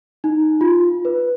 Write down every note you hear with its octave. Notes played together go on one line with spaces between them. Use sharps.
D#4
F4
B4